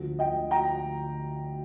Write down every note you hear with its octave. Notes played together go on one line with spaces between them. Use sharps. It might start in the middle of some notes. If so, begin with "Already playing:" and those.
Already playing: D2 D3 F3
D#5 G5
G5 A#5